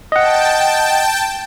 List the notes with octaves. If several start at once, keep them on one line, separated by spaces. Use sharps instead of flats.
D#5 F#5 G5 A5